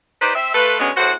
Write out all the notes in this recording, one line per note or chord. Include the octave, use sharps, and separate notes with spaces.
D#4 G4 B4 C5 D5
C4 E5
A3 F4 A4 B4
D3 F#3 G#3 B3 C#4
E2 A2 F#4 C5 F#5